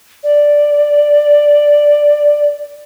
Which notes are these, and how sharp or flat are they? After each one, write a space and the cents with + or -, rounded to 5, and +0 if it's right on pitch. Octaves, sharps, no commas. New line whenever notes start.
D5 +0